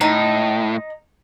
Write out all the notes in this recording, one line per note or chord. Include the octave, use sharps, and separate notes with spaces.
A2 D#4